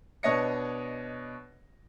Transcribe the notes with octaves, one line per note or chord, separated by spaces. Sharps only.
B2 D4 C#5 D#5 A#6 C#7